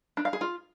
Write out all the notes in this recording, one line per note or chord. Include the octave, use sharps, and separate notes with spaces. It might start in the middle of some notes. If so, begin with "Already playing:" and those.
D4
F5
G#4
F4